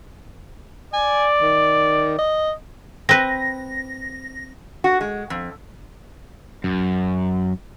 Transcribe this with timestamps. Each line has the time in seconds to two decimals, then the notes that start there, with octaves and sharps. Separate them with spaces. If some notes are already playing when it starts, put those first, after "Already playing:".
0.94 D5 G#5
1.42 D#3
2.19 D#5
3.09 C4 B4 A#6
4.84 F#4
5.01 G#3
5.30 F2
6.64 F#2